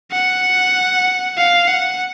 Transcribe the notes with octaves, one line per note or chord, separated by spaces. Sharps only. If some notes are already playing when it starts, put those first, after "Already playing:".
F#5
F5
F#5